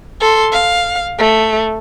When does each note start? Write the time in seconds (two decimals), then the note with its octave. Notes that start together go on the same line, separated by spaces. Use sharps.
0.21 A4 C6
0.52 F5
1.19 A3